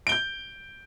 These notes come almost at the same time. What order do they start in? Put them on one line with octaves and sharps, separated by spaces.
D7 G7 G6